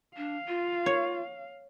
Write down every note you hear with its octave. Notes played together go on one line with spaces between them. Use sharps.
D4 F5
F4
C#5